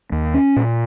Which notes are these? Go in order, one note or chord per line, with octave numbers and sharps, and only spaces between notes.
D#2
C#4
A#2